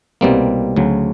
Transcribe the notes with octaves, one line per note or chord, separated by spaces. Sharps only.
C2 B2 G3 A#3 C4
D2 C#3 F#3